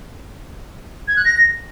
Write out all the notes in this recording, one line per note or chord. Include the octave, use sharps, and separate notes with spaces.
G#6
F#6
A#6